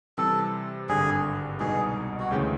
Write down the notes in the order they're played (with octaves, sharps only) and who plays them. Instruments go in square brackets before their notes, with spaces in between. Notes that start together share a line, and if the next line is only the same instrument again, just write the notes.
[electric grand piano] C3 E3 G3 C4 [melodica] A4
[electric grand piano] G#1 G2 D3 [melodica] G#4
[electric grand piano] C2 B2 G#3 B3 D#4 [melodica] G#4
[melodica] F#4
[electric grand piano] D2 C#3 E3 G#3 C#4 [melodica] G4